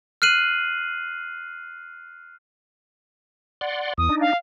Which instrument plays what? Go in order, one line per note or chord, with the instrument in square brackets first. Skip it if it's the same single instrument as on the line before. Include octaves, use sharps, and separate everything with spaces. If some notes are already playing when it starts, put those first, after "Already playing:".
[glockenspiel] F6 F#6 C7 D#7 F#7
[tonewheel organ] D5 F#5 C6
[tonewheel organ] E2 [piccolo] D#6
[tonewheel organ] D4 D#4
[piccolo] F5